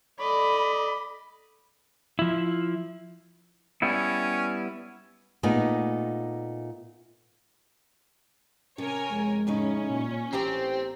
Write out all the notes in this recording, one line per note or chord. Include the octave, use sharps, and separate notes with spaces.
A4 D5 D#5 B5
F3 E4
G3 B3 C#4 E4
A#2 A3 B3 D#4 G#4
C3 C#4 A#4 C#5 G#5
F2 G#3
A2 C#3 C#4 D#4
A#2
A1 C4 G4 C5 A#5